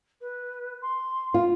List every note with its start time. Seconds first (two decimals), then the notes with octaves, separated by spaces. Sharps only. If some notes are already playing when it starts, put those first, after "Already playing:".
0.21 B4
0.82 C6
1.34 F4